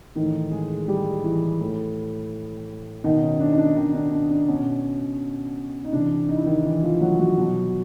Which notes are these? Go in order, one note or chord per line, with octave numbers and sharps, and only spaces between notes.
A2 D#3 E3 D#4
G#3 G#4
G3 G4
E3 E4
A2 E3
B2 D#3 D#4
C#4
D4
D#4
D4
D#3 D#4
D4
D4
D4
B2 C#4
D#4
C3 E3 D4
D#4
E4
D#3 D#4
E3 E4
F3 F4
F#3 F#4
F#3 F#4
B2